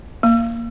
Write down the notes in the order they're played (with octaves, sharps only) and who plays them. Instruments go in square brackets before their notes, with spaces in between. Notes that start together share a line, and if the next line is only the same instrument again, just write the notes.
[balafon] A#3